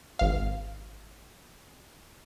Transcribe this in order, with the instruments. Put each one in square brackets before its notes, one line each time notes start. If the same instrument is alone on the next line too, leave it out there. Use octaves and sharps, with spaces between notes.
[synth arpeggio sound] G#1 F5